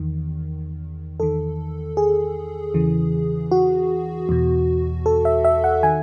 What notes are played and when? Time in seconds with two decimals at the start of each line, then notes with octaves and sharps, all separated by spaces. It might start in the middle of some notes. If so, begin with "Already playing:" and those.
Already playing: E2 D#3
1.20 E2 D#3 A4
1.97 G#4
2.74 E2 C#3 E3
3.51 F#4
4.29 E2 B2
5.06 A4
5.25 E5
5.45 E5
5.64 F#5
5.83 D#3 G#5